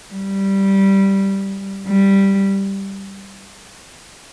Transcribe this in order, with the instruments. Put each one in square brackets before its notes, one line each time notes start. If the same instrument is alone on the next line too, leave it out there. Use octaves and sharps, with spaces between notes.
[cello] G3
G3